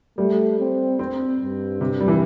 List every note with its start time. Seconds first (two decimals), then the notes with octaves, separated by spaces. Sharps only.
0.17 G3 A3
0.59 C4
0.99 C4
1.40 G2
1.81 C3
2.00 G3
2.08 E3